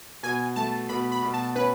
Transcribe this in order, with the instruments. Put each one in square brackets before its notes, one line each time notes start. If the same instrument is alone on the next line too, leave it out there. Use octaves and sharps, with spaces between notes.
[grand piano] B2 [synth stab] G#5
[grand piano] A3 [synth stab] A5
[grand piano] B2 [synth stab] B5
[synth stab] B5
[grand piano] B2
[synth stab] A5
[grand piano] C#4 [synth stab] B4